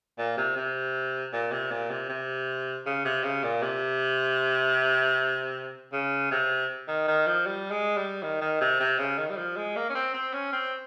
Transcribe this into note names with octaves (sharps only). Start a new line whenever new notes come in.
A#2
C3
C3
A#2
C3
A#2
C3
C3
C#3
C3
C#3
A#2
C3
C#3
C3
D#3
D#3
F3
G3
G#3
G3
D#3
D#3
C3
C3
C#3
D#3
G3
F3
G#3
A#3
C#4
C4
C4
C#4
C4